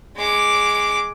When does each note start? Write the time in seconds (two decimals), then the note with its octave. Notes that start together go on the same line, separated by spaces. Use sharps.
0.17 G#3 D6